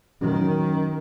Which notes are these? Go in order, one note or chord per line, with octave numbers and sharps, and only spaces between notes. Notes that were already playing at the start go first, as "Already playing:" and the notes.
F#2 D#3